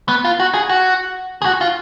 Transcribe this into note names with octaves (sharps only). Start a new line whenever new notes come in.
B3
F4
F#4
G#4
F#4
G#4
F#4
F4